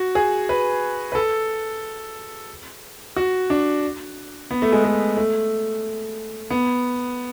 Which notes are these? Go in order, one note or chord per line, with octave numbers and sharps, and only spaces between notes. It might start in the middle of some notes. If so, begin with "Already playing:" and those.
Already playing: F#4
G#4
B4
B4
A4
F#4
D4
B3
A3
G#3
A3
A3
B3